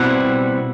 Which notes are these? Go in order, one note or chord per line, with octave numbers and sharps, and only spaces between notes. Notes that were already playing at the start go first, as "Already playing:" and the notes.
Already playing: B2 G3 C4 E4 F#5